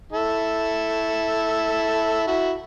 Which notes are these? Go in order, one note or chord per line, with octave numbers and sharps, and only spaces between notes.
E4 A4
E4 F#4